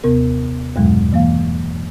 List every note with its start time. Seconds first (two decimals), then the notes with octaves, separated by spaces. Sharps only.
0.04 D#2 C3 B3 A#4
0.76 E2 G2 B2 F#3 G#3
1.12 E3 A#3 F5